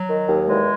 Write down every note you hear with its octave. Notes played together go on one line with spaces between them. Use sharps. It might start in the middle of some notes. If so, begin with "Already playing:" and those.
Already playing: F#3
D#3
D#2
E2 G#3